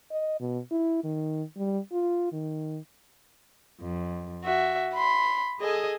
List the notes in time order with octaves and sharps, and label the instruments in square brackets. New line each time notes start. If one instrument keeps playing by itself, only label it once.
[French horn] D#5
B2
E4
D#3
G3
F4
D#3
[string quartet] F2
F#4 E5
B5 C6
G#4 A4 D#5 G#5